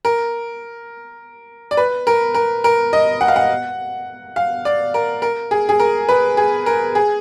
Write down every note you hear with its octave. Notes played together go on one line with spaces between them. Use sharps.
A#4
D5
B4
A#4
A#4
A#4
D#5
F#5
F5
F#5
F5
D5
A#4
A#4
G#4
G#4
A#4
B4
G#4
A#4
G#4